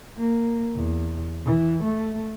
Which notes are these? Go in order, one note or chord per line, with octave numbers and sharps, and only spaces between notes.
A#3
E2
E3
A3